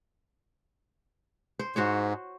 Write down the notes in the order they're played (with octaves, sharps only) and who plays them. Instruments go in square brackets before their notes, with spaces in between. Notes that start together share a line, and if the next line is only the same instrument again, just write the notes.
[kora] C5
[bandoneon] G#2 [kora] F#4 C5 C#5